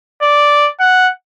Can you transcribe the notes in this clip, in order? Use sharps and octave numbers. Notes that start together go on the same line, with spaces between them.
D5
F#5